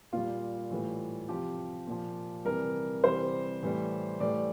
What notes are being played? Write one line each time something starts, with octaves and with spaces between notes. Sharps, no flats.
A#2 G3 F4
A2 E3 G3
C3 F3 G4
A#2 F3
C3 E3 G3 A#4
C3 E3 G3 C5
A2 E3 G3
A2 E3 G3 D5